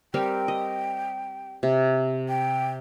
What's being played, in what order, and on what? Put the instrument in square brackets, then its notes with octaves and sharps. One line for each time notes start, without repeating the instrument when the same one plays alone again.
[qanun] G3 C4 A#4 [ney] G5
[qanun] D#5
C3
[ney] G5